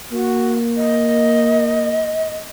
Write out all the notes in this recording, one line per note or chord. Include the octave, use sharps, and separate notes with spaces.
A#3 F#4
D#5